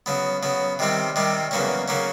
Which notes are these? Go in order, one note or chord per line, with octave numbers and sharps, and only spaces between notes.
C#3 F#3 B3
C#3 F#3 B3
C3 D#3 G3 C4
C3 D#3 G3 C4
E2 C#3 F#3 A#3 C#4
C#3 F#3 A#3 C#4